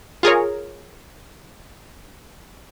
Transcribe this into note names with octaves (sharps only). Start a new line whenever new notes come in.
F4 G#4 A#4 C#5